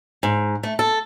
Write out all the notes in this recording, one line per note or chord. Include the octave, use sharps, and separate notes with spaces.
G#2
A3
A4